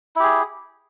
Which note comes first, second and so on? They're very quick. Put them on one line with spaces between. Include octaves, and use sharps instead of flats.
E4 G4 G#4